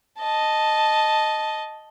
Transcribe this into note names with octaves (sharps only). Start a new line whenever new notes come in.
D#5 A5